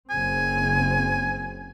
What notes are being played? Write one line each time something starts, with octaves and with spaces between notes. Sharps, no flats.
F#1 C#3 C4 G#5